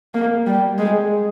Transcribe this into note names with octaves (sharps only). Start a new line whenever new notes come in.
A#3
G3
G#3